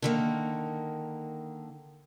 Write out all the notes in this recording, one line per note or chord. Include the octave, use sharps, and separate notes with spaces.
D3 D#3 A#3